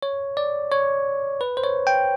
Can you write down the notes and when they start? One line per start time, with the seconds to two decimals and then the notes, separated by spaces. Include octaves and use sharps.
0.03 C#5
0.37 D5
0.72 C#5
1.41 B4
1.57 C5
1.63 C#5
1.87 G5